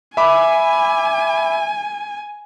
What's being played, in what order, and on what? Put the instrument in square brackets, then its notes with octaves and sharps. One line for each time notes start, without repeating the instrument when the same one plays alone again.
[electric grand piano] E5 B5 D6 [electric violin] G#5